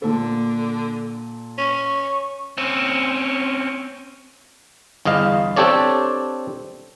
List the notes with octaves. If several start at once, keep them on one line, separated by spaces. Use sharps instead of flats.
A#2 D3 A4
C#4 C#6
C4 C#4
G1 E2 D#5 F5
C4 D4 G4 A4 C#5 D5